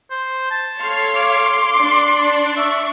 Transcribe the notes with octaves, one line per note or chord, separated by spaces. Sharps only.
C5
A5
A4 C#5 F5 C6
D6
D4 D5
E5 C#6